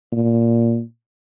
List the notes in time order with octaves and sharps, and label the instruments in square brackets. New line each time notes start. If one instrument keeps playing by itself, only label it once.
[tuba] A#2